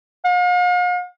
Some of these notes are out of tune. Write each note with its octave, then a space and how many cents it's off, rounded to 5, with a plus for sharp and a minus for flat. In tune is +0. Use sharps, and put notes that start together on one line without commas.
F5 +45